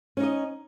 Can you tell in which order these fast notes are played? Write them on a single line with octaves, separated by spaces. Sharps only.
C#4 D#4 D#5